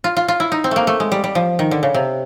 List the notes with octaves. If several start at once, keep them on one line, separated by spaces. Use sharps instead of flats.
F4
F4
F4
E4
D#4
C4
A3 A#3
A3
G#3
G3
G3
F3
D#3
D3
C#3
C3